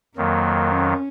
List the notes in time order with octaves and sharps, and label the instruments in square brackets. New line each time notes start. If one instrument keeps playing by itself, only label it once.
[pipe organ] F2 D#3 F#3 [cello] A#3
[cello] C#4